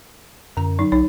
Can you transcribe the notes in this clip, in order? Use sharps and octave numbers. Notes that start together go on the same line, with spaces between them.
F#2 D3 A#5
F#3 D#4
B1 D#4 C#5